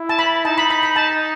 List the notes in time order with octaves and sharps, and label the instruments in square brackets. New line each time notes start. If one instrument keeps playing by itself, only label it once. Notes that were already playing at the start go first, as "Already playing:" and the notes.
Already playing: [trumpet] E4
[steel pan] A5
B5
[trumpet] D#4 [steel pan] A5
[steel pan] B5
B5
B5
A5